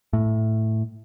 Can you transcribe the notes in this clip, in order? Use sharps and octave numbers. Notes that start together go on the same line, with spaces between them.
A2